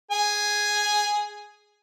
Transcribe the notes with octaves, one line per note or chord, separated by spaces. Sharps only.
G#4 G#5